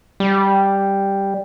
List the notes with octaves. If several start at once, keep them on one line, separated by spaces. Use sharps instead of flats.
G3